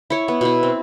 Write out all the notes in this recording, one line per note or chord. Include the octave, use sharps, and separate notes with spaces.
E4 C#5
B3
B2 E4
C4